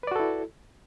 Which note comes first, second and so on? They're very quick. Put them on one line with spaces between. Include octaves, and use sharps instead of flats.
B4 D5 F#4 A4 E4